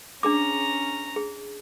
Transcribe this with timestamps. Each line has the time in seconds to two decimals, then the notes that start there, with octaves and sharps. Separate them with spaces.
0.23 C#4 D4 G#4 A#5 D6
1.16 G#4